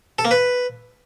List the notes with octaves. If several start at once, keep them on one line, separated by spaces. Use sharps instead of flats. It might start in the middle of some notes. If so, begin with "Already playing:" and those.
A4
A#3
B4